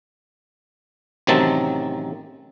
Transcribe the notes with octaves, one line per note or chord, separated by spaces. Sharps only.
A1 C3 D#3 F#3 C4 A5